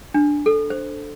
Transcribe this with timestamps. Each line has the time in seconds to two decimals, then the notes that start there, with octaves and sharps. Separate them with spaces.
0.14 D4
0.46 A4
0.70 C5